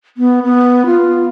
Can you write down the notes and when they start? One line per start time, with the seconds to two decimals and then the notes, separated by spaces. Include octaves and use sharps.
0.17 B3
0.43 B3
0.86 F4